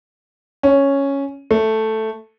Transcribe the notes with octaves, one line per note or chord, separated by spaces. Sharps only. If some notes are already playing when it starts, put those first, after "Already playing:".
C#4
A3